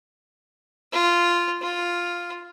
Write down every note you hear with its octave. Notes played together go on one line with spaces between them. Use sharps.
F4
F4